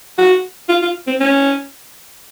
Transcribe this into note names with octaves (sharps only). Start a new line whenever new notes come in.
F#4
F4
F4
C4
C#4